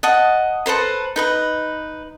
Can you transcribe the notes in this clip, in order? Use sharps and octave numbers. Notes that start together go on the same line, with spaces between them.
D#5 F#5 A5
A4 B4 C5 A#5
D#4 B4 A#5